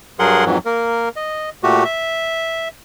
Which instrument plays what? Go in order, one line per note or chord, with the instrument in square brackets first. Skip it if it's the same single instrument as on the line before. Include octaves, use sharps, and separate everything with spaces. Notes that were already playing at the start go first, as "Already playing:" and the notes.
[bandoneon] G2 F#3 G#4 A#4 F#5 C6
F2 G#2 E3 F#3
A#3 A#4
D#5
A#2 A3 F#4 G4
E5